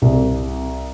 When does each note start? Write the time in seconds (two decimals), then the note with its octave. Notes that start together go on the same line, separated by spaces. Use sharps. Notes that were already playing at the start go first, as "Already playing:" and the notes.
0.02 C2